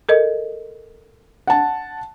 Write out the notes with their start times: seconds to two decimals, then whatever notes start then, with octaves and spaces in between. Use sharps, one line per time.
0.09 A4 A#4 D#5
1.47 F#5 A5